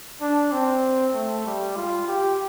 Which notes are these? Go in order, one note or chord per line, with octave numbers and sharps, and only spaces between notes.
D4
C4
A3
G3
F4
G4